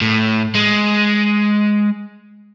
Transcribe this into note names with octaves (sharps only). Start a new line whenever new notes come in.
A2
G#3